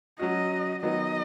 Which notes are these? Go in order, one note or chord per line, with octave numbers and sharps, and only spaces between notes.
F#3 C#4 F#4 D#5
D#3 F#3 B3 D#4 D#5